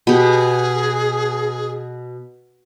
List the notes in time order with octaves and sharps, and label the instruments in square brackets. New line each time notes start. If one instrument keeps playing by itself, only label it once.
[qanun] B2 G4 [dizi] G#4